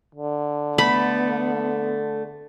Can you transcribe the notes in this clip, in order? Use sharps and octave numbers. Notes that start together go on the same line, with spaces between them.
D3
A3 B3 B5